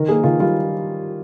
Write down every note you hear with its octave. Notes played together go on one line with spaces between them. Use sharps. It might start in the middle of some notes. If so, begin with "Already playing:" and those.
Already playing: D#3 A#4
A#3 G#4
D#3 F4
G3 F4